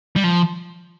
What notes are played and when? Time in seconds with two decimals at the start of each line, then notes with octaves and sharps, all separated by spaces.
0.16 G3
0.24 F3